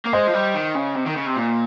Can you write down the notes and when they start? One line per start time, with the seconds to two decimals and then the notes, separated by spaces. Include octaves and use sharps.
0.06 A#3
0.13 G#3 C5 D#5
0.28 F3
0.34 G3
0.54 D#3
0.75 C#3
0.95 C3
1.06 D#3
1.16 C#3
1.26 C3
1.36 A#2